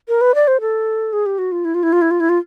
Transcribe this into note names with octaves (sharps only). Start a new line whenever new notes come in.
A#4
B4
D5
C5
A4
G#4
G4
F#4
F4
E4
F4
E4
F4
E4
F4
E4
F4